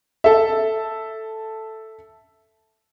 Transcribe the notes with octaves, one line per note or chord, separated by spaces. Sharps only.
A4 E5